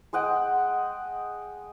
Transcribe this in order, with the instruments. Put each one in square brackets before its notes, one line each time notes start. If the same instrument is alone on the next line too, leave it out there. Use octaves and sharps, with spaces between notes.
[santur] G#3 D#5 F#5 G5